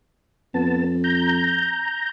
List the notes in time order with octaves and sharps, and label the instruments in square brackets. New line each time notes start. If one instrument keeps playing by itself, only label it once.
[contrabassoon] F2 [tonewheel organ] B3 A5
[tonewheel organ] A#5 G6